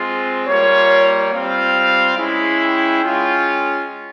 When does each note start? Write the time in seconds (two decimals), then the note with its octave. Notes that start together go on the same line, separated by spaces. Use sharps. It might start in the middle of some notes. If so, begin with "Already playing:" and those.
Already playing: G#3 C4 F4
0.47 G3 A#3 F4 C#5
1.32 G3 C4 F4 F5
2.18 G#3 C#4 E4
2.60 G5
3.03 G#3 C#4 F4